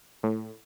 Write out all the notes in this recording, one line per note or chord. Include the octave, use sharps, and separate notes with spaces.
A2